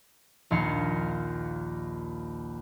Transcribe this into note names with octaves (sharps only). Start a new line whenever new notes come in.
A#1 D#2 F5 C#7